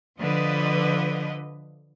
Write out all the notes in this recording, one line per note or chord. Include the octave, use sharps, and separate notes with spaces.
D3 F3 B4 D#5